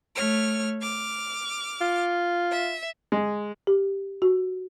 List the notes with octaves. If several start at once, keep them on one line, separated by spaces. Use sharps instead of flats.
A3 C#5 F6
D6 F6
F4
E5
G#3
G4
F#4